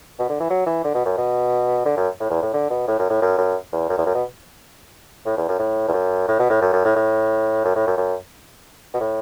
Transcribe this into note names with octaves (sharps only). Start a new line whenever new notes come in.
B2
D3
E3
F#3
E3
D3
B2
F#2
B2
D3
F#2
A2
E2
A2
D3
B2
A2
F#2
A2
F#2
F#2
E2
F#2
E2
F#2
B2
A2
E2
F#2
A2
E2
F#2
A2
B2
A2
F#2
F#2
A2
A2
F#2
A2
F#2
F#2
B2
A2